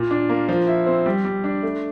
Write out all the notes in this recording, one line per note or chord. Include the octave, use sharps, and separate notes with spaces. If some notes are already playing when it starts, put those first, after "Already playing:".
Already playing: A#2
D4
A#3
F3
E4
C4
G3
G3
D4
A3